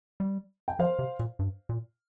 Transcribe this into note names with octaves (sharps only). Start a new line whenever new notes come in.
G3
G5
F3 C5 F5
C3
A#2
G2
A#2